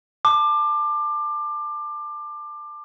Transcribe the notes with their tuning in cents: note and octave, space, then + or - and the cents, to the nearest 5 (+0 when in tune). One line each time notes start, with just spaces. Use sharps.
A5 +0 D6 +25